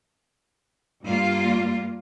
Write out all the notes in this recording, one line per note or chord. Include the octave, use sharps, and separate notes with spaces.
G2 G3 A#3 F4